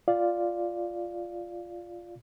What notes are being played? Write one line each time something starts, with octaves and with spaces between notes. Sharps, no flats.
F4 D5 F5